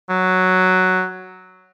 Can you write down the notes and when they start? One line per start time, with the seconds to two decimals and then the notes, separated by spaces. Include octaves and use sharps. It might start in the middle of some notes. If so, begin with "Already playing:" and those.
0.10 F#3